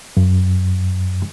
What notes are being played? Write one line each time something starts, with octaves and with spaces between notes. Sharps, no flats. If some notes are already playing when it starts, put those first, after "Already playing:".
F#2